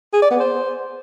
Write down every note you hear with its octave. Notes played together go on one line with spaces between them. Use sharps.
G#4
D5
B3
C5